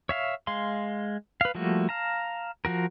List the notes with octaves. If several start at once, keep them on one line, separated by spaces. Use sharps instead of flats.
C#5 E5 F5
G#3 F5 C6
B4 F5
F3 G3 A3 A#3 F#4
F5 A5 A#5
F3 F#4 A#4